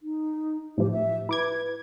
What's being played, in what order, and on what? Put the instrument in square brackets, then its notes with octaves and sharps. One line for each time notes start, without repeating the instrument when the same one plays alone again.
[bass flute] D#4
[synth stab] A2 F3 [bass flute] G4
[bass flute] E5
[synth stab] E4 D6 G#6 [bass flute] B4